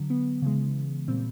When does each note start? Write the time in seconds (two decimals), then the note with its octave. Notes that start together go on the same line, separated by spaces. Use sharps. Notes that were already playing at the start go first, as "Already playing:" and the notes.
Already playing: D3 F#3
0.10 B3
0.42 C#3 E3 G#3
1.08 A#2 G3 C4